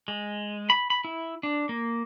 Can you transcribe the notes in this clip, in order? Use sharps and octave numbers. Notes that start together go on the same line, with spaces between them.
G#3
B5
B5
E4
D4
A#3